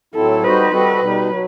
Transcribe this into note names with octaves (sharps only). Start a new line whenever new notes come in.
A2 F#3 C4 E4 A4
G3 D#4 F#4 B4 C5 D#5
G3 C4 F#4 A4 D#5
B2 G3 D#4
F#3